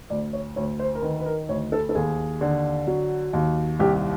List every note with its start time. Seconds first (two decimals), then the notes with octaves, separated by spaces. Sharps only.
0.10 D2 D5
0.33 C#5
0.56 D2 C#5
0.79 C5
0.95 A#4
1.02 D#3 B4
1.20 B4
1.26 A#4
1.48 D2 C#5
1.72 A4
1.89 A4
1.95 D#2 G#4
2.41 D3
2.87 F#3
3.33 D#2
3.80 C2 G4